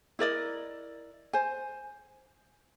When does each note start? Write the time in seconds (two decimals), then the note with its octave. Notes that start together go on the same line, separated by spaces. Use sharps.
0.19 E4 A#4 D5 D#5
1.33 C5 G#5